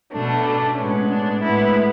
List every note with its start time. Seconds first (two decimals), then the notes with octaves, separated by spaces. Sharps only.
0.13 B2 A3 D4
0.78 A2 G#3 B3 C#4
1.10 D4
1.43 A2 G#3 B3 E4